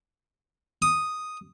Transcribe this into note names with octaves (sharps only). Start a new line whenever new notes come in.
D#6